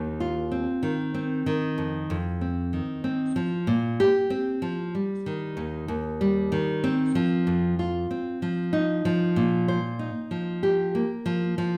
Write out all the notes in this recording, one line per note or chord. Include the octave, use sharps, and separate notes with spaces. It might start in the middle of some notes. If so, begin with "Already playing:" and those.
Already playing: D#2 D#3
F4
C4
D#3
C4
D#3
F2
F2
C4
D#3
C4
F3
A#2
G4
C4
F3
G3
D#3
D#2
D#2
G3
D#3
C4
F3
F2
F4
C4
F3
D#4
F3
A#2
C5
D#4
F3
G4
A#3
F3
F3